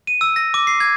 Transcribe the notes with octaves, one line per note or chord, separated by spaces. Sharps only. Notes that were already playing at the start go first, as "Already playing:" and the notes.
D#7
E6
A#6
D6
C7
G#6